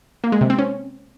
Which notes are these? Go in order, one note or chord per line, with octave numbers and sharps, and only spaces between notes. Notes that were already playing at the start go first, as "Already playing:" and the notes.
A#3
G#3
C3
C4
C#4